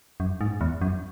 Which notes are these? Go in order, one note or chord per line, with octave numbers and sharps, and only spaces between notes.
F#2
G#2
E2
F#2